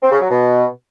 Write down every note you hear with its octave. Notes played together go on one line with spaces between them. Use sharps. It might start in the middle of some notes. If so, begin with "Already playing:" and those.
C4
C#3
F#3
B2